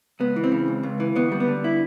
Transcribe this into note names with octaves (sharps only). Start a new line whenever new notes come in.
C#2 B3
E3
C4
C#3
C#2
C#2
E3
D2 B3
G3
B3
D3
E4